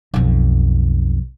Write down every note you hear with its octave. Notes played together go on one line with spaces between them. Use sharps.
B1 F2